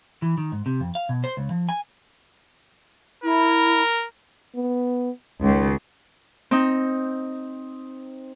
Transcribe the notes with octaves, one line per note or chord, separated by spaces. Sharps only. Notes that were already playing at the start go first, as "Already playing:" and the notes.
E3
D#3
G#2
C3
F2
F5
B2
C5
C#2
F3
G#5
E4 A#4
B3
C#2 D#3
C4 D#4